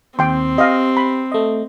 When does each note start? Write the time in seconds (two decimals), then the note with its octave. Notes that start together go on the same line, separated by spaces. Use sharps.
0.19 D#2 C4 G5 C6
0.58 G4 D#5 F5
0.97 B5
1.32 A3 D#5